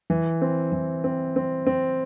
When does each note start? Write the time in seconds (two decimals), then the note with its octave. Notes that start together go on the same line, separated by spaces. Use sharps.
0.10 E3
0.42 C4
0.72 E3
1.04 C4
1.36 C4
1.67 C4